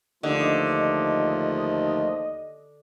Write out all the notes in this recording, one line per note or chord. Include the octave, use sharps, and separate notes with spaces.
D#2 D3 F3 A3 F4 D#5